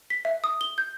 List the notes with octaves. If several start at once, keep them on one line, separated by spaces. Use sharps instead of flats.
B6
E5
D#6
G7
G6